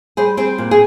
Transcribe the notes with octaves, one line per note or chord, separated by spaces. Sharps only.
G3 G#4 C5
C4 G#4 C5
A#2
G#4